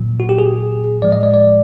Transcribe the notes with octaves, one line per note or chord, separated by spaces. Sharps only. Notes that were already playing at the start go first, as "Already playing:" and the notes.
Already playing: A#2 F#3
F#4
G4
G#4
A2 F3 G#3 D5
D#5
D5
D5